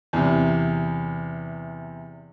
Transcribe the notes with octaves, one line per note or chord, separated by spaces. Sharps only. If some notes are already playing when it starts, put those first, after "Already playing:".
E2 C3